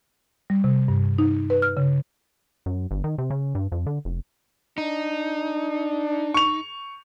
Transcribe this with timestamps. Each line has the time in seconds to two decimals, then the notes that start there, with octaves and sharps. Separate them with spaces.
0.50 G3
0.64 C3
0.88 G2
1.19 D#4
1.50 B4
1.62 F6
1.77 C#3
2.66 F#2
2.91 G1
3.04 D#3
3.18 C3
3.30 C#3
3.55 G2
3.72 F2
3.87 D3
4.05 F1
4.78 D4 D#4
6.34 C#6 F7